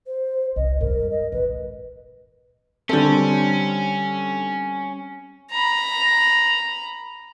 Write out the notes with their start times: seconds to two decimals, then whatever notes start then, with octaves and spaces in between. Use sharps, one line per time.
0.07 C5
0.56 C2 D#5
0.81 G2 A#4
1.10 D#5
1.32 A#1 D#2 B4
2.89 D3 G3 C4 C#4 A4
5.51 A#5 B5